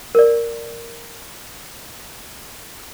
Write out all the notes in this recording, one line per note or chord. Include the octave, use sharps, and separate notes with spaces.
A#4 D5